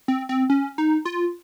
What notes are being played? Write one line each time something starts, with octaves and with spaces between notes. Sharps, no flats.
C4
C4
C#4
D#4
F4